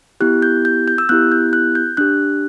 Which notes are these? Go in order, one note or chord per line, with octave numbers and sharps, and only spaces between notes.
B3 E4 G4 F#6
G6
G6
G6
E6
B3 E4 G4 F#6
G6
F#6
G6
D4 G4 F#6